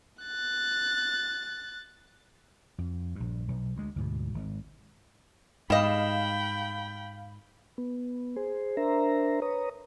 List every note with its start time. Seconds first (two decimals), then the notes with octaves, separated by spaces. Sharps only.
0.23 F#6 A6
2.78 F2
3.16 A#1 G2
3.48 B1
3.77 D2 G#3
3.96 D2 G#2 B2
4.34 G#1
5.70 G#2 G3 D#5 F5 G5 B5 E7
7.78 B3
8.36 G#4 C5
8.77 D4 A#4 C5 E5 A#5
9.42 B4 C#5 A#5 D#6